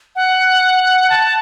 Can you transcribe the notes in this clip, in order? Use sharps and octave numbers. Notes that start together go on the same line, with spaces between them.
F#5
A5